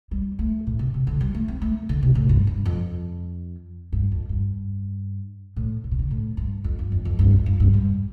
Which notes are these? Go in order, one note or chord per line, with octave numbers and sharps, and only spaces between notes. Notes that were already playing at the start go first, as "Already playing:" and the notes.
G3
A3
A2
C3
C3
D3
G3
A3
C4
A3
D3
C3
A2
G2
G2
F2
G2
F2
G2
A2
D3
C3
D3
A2
G2
F2
G2
F2
F2
G2
F2
G2
G2
G3